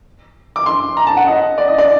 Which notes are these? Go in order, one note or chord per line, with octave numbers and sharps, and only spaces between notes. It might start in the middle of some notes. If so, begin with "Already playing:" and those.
D6
C6
A#5
A5
F#5
D#5
D5
D#5
D5